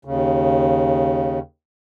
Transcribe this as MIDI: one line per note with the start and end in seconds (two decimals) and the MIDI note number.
0.05 1.39 39
0.05 1.39 49